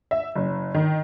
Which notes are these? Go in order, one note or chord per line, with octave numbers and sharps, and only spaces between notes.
E5
F#1
D#3